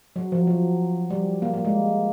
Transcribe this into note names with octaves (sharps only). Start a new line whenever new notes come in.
F#3
F3
F#3
G3
A#3
A#3
G#3